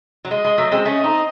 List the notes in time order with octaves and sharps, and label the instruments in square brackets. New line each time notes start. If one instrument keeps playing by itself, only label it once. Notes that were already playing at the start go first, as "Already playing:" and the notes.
[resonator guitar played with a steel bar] F#3
[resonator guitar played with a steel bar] G#3 [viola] D#5
[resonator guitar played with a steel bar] G#3
F#3 A3
G#3 C4
[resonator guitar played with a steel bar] A3 C#4 [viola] D#5
[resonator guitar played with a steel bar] C4 D#4